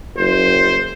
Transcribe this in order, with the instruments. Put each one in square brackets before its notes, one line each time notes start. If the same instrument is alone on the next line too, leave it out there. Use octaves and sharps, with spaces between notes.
[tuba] F#1 [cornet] C5